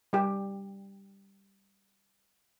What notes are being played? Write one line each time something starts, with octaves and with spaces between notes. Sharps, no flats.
G3 G4